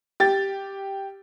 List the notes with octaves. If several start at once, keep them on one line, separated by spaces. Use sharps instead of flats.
G4 A6